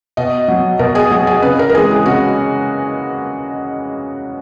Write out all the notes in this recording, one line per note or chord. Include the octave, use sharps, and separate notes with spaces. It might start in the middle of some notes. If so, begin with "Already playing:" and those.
B2 D#5
F#3
B2 A#4
G#4
F#3 G#4
G#4
C#3 B4
A#4
A#4
E3 G#3 G#4
G#4
C#3 F#4